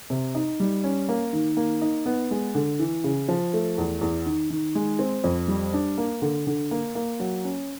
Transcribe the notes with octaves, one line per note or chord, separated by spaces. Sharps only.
C3
D#4
G3
C#4
A#3
D#3
A#3
D#4
B3
G#3
D3
E3
C#3
F3
A3
E2
E2
D#3
D#3
G#3
C4
F2
G3
D4
A#3
D3
D3
A#3
A#3
F#3
C#4